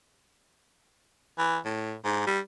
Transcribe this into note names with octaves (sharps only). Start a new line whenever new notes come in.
E3
A2
G#2
G3